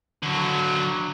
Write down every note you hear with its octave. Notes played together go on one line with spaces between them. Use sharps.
D3 F#3